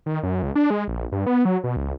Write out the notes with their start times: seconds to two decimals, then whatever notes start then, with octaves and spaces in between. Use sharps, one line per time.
0.06 D#3
0.23 F#2
0.43 C#2
0.56 D4
0.70 G#3
0.88 A#1
1.12 G2
1.26 B3
1.45 F#3
1.64 B2
1.76 C#2